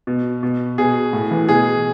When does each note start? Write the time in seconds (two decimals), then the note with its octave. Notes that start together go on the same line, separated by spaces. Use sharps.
0.07 B2
0.43 B2
0.78 B2 G#4
1.13 A2
1.31 E3
1.49 B2 G#4